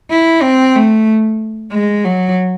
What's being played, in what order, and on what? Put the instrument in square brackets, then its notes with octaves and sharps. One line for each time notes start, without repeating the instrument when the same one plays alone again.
[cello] E4
C4
A3
G#3
F#3